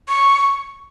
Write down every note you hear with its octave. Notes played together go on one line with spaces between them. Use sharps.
C#6